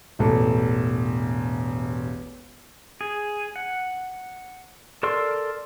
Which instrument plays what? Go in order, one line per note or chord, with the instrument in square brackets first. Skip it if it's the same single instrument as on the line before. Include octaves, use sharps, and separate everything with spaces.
[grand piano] E1 A1 A4
[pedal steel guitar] G#4
F#5
A4 A#4 D5 C6 E6